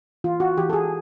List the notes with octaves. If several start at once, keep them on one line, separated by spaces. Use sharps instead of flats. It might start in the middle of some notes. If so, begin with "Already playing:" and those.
E3 F4
F#4
E3 G4
A4
G#4